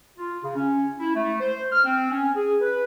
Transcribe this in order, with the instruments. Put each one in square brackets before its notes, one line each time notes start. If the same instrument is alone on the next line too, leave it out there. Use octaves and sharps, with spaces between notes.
[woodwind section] F4
C#3
C#4
E4
A3
C5
F6
C4
C#4
G#4
B4